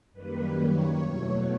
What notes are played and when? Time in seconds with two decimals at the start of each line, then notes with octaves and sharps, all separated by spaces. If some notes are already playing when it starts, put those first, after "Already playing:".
0.13 F#2 D#3 G3 A#3 B4
0.55 C#5
0.98 E2 B2 F#3 A3